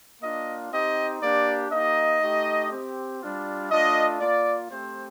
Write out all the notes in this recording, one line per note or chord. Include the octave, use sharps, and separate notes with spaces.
A#3 D4 F4 D#5
C4 D#4 G4 D#5
A#3 D4 G4 D5
A#3 D#4 G4 D#5
A3 D#4 G4
C4 G4
G3 D4 F4
A3 D4 F4 D#5
A#3 F4 D5
A3 C4 G4 C5